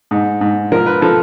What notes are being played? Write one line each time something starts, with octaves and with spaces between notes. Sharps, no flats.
G#2
G#2
F3 A#4
B4
F3 A4